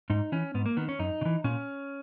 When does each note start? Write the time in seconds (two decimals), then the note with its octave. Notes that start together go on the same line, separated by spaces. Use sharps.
0.10 G#2 D#4
0.32 E3 C#4
0.54 G#2 B3
0.66 A#3
0.77 D#3 B3
0.89 C#4
0.99 F#2 D#4
1.21 C#3
1.25 E3
1.44 A#2 C#4